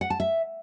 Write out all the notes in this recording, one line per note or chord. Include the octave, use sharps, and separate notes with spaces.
F#5
A5
E5